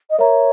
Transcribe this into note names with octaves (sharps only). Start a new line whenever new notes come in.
D#5
A#4 C#5 E5 A#5